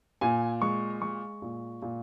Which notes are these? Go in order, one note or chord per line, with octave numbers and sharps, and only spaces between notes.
A#2 G#5
G#3 C#6
G#3 C#6
A#2
A#2